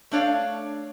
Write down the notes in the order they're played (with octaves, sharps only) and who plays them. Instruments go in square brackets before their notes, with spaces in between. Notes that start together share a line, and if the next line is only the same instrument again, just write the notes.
[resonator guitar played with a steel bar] A3 D4 C#5 D5 F5